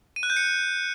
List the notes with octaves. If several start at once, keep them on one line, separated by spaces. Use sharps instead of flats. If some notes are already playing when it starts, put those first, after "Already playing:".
D#7
F#6
G6
C#7